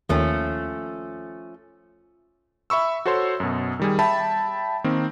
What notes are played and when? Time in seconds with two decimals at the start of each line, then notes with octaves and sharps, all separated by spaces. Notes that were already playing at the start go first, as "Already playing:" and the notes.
0.09 D#2 D#3 F3 A3 C#4
2.70 E5 B5 C#6 E6
3.06 F#4 A4 C5 C#5 C6
3.40 F#2 B2
3.79 D#3 G3 G#4
3.99 E5 G5 A5 B5
4.84 D#3 A#3 C4